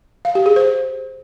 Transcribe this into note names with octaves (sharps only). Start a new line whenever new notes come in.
F5
G4
G#4
C5